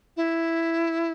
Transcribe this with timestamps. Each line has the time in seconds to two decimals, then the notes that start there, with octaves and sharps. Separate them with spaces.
0.16 E4